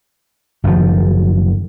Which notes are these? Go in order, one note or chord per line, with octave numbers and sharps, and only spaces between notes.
F#1 F#2 D#3 F3